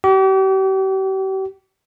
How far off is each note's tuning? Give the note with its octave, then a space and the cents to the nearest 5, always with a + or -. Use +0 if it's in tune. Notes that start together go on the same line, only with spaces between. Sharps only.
G4 -40